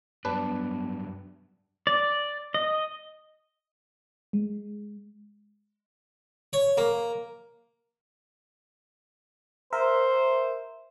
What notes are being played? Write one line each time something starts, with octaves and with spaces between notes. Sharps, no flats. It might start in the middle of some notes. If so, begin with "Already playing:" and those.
G2 F#3 B3 D4 B4
D5
D#5
G#3
C#5
A#3
A#4 C5 E5